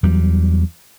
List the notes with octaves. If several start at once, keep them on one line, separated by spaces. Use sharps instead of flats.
E2 F#3 G3